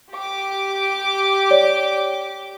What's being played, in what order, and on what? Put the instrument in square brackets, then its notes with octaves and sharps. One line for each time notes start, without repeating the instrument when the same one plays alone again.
[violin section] G4 D6
[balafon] C#5 D5